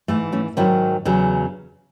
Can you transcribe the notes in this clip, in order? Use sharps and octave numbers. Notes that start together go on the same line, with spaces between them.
G#2 E3 A3
A3 C#4
G#2 D#3 F#3 C#4 E4
E2 C#3 F#3